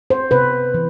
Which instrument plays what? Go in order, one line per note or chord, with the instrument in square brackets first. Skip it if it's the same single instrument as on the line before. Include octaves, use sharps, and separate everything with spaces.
[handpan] C5
C3 B4
E3